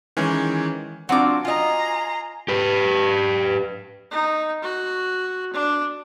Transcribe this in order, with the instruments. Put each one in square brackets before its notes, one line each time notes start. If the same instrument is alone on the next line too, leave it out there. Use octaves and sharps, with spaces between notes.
[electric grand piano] D#3 E3 G#3 C#4
[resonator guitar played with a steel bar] F#3 C4 F4 [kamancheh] D4 [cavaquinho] F#4 D6
[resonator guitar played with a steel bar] F4 D#5 [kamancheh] G#5 [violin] A#5 C6
[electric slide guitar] G4 B4
[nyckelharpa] D#4
F#4
D4